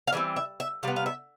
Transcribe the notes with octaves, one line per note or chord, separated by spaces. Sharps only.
F5
E3 G3 C4 E5
E5
E5
C3 G3 B3 F5
F5
E5